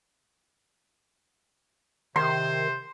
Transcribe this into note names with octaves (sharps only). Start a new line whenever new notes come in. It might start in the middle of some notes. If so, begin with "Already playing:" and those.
C3 D#3 C5 C6